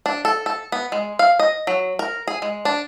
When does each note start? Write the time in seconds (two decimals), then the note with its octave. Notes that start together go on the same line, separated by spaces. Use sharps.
0.06 D4
0.25 A4
0.46 A4
0.72 B3
0.92 G#3
1.19 F5
1.39 D#5
1.67 F#3
1.99 A#4
2.28 G#4
2.42 G#3
2.65 D4